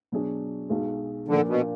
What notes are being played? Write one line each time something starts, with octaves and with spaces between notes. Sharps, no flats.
B2 F#3 D4 G#4
B1 B2 G#3
A#2 D3 F3 A#3 D4
B2